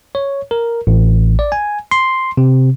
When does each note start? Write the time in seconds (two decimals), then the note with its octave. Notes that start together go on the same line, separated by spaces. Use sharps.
0.15 C#5
0.51 A#4
0.87 A1
1.39 D5
1.52 G#5
1.91 C6
2.37 C3